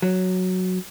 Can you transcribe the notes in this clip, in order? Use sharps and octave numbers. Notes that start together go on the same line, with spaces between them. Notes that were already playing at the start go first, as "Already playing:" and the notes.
F#3